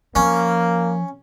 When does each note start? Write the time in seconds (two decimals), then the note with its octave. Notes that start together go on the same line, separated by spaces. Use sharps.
0.15 F3 A#3 C#4